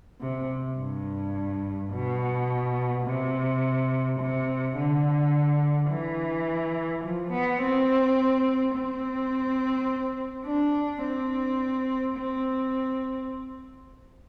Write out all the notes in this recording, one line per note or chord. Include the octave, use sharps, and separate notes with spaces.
C3
G2
B2
C3
C3
D3
E3
F3
B3
C4
C4
D4
C4
C4